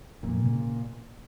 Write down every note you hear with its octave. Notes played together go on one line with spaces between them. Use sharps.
F2 A#2
C#3